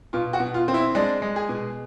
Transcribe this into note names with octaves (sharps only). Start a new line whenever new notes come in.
B2 F4
F#4
B2
F4
C4
E4
G#3 D4
G#3
G#4
B2